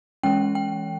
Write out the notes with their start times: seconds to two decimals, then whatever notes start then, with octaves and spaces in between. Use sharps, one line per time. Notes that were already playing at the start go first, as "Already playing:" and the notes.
0.23 E3 G#3 C#4 G5
0.55 G5